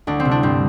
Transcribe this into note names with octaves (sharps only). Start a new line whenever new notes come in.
D2 D4
C4
C3
D4
G2 C4